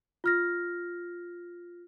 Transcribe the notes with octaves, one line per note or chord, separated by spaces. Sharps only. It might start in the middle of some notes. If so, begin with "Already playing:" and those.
F4 F6 A#6